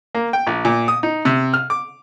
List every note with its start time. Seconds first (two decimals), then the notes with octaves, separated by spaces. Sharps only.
0.15 A#3
0.33 G5
0.47 A#1
0.65 A#2
0.88 D#6
1.03 D#4
1.25 C3
1.54 F6
1.70 D6